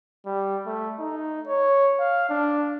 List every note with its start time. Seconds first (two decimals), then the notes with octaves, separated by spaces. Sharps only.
0.26 G3
0.66 A3
0.99 D#4
1.48 C#5
1.99 F5
2.29 D4